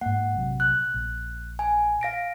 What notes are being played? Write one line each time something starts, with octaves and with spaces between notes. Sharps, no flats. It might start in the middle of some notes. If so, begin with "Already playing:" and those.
G#2 A#3 F#5
A#1 C3 F#3
F#6
A#1
G#5
F5 A#6 D7